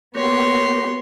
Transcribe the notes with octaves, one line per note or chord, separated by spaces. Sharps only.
A#3 B3 F#4 G4 C#5 C6